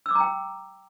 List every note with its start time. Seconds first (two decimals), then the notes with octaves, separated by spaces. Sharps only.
0.06 E6
0.11 D6
0.15 A#5
0.20 G5